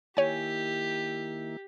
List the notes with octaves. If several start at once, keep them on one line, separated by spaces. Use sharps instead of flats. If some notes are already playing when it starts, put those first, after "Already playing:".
D#3 A#3 E4 G4 C#5 G#5